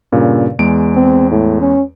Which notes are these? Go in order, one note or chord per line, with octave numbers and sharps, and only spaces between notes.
G2 A#2 C#3
E2 G#3 D7
C4
A2
C#4